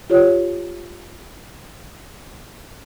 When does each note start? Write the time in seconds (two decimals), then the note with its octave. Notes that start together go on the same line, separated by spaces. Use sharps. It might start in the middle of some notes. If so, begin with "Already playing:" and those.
0.10 F4 G4 C#5